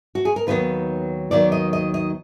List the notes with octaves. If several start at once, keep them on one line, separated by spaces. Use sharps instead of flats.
F#4
G#4
A#4
D#2 D#3 F#3 B3 B4
D#2 D#3 F#3 B3 D5
D#5
D#5
D#5